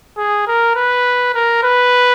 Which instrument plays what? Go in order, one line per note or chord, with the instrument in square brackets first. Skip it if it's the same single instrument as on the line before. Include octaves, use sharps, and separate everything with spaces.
[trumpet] G#4
A#4
B4
A#4
B4